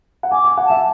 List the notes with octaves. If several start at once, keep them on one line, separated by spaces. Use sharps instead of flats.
F#5
G#5 D6
G#5
F#5
E5 A5